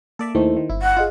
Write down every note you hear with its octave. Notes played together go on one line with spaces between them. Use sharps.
A#3 A4 D5 E5
D#2 D#3 A3 E4 C5
D#3
G1 E4
F#5
F4 G#4 D#5 F#6